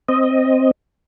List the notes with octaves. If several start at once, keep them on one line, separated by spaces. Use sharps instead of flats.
C4 D#5